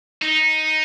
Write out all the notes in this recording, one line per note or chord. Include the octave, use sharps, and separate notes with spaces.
D#4